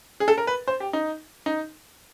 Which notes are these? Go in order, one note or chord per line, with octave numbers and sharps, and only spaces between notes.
G#4
A4
A#4
B4
C5
G4
D#4
D#4